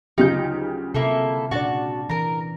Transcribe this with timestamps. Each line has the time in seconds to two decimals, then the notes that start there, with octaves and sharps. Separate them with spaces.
0.18 D2 C#3 F#3 D#4 F4 G4 G6
0.94 C3 A#3 E4 A4
1.51 A#2 D4 F#4 D5 A5
2.09 E3 A#4 A#5